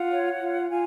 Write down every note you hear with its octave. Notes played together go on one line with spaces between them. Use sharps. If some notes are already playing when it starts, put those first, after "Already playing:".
Already playing: F4 F#5
C#5
F4
F4 G#5